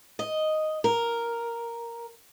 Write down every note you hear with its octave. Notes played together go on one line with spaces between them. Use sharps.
D#5
A#4